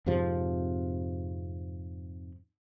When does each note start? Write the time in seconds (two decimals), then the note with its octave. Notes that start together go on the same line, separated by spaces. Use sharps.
0.06 F2 G#2 C3 F3